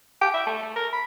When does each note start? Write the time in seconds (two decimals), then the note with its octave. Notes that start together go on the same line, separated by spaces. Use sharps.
0.21 G5
0.34 E5
0.46 A3
0.63 A3
0.76 A#4
0.93 B5